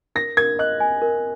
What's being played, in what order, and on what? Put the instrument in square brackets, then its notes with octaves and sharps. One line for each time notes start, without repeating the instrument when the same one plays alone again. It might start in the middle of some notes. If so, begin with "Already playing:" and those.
[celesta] A#4 [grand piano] A#6
[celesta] A#4 [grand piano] G#6
[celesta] D#5 [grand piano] F#6
[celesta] G#5
A#4